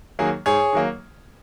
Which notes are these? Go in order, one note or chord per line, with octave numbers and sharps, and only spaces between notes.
D#3 F#3 A#3 G#4
G#2 G#4 C#5
D#3 F#3 A#3